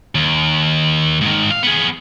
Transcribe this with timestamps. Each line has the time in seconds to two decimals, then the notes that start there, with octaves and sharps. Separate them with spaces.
0.15 D#2
1.21 G#2 D#3
1.51 F5
1.63 B3 G#4